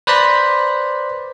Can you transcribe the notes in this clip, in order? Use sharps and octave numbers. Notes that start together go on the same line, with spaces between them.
B4 C5 D5 A#5 B5